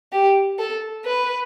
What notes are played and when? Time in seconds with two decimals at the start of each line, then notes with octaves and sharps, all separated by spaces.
0.12 G4
0.58 A4
1.05 B4